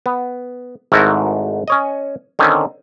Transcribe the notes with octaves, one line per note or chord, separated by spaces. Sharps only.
B3
G#1 G#2 A3 E4 F#4 A#4
C#4 C#5 D#5
D3 D#3 C4 C#4